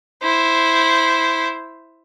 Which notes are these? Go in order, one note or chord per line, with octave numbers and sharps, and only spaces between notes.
E4 C5